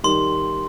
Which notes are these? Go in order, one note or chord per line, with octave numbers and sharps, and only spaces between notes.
D#3 G3 C6